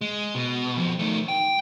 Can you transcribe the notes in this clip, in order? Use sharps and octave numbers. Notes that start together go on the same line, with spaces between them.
G#3
B2
F2 F3
D#3 A3
G5